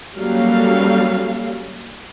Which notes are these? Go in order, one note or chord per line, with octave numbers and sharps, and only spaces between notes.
F#3 G3 A#3 C#4 A4 F5